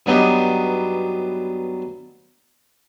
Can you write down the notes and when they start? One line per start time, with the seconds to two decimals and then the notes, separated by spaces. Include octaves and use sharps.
0.06 G2 F#3 B3 D#4 G4